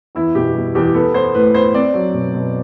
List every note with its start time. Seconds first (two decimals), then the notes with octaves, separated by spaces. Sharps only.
0.15 E2 E4
0.35 B2 G4
0.55 G3
0.75 E2 G4
0.94 B3 A4
1.14 B3 C5
1.34 A2 B4
1.54 B3 C5
1.74 C4 D5
1.94 F#3
2.14 B2
2.34 B2